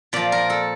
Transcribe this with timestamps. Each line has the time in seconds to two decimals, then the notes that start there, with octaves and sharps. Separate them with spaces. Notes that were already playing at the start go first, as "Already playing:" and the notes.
0.13 A#2 F3 D5
0.32 A#4
0.50 A4